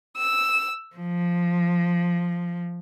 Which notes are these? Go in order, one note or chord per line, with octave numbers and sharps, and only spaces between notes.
E6
F3